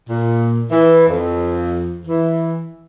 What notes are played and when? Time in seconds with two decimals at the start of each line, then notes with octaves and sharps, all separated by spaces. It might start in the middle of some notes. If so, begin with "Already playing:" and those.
0.09 A#2
0.71 E3
1.07 F2
2.06 E3